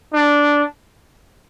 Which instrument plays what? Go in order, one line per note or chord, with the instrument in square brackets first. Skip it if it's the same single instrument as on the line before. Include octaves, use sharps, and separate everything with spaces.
[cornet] D4